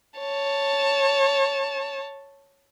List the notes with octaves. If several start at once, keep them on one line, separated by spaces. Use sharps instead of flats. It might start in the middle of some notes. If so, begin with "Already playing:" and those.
C#5 A5